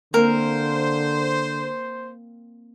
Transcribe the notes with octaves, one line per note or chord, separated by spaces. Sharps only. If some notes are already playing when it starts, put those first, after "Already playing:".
D3 A#3 C4 A#4 C5